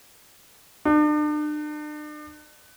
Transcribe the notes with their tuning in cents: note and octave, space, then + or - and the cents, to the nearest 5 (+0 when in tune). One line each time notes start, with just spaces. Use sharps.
D4 +40